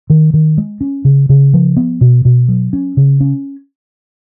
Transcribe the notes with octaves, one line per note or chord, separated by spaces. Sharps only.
D#3
D#3
G#3
C#4
C#3
C#3
F3
B3
B2
B2
F#3
C#4
C#3
C#4